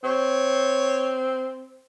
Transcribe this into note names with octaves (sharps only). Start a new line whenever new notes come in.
C4 C#5